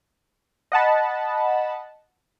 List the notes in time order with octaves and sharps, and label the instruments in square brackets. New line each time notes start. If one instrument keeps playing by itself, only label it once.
[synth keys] D#5 F#5 A5 B5